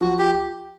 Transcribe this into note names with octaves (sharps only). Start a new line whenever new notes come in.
F3 F#4
G4